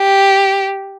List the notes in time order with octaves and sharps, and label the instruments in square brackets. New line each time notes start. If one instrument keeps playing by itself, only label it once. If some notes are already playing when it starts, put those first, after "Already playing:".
Already playing: [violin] G4